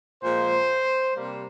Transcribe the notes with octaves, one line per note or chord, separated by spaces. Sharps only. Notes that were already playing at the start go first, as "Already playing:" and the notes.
A#2 F3 G#3 C5
C3 G3 A#3